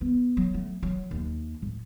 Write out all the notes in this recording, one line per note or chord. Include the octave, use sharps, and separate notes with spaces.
B3
F#3
A3
F#3
D#2
A2